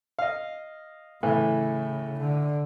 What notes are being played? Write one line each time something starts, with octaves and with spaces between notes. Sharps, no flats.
D#5 F5
A2 C#3 E3
D3